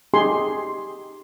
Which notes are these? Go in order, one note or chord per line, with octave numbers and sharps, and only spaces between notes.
D#4 G4 G#4 G#5 C6